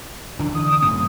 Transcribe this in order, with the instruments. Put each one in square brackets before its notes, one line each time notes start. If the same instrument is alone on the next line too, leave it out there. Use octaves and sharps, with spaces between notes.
[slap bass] D3 E3 D4
[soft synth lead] D#6
[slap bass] F#2 A2 C4